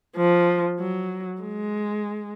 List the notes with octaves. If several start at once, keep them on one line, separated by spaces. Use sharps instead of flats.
F3
F#3
G#3